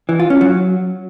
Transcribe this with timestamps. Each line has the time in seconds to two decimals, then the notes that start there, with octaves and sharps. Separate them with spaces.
0.09 E3
0.19 F4
0.30 C#4
0.41 F#3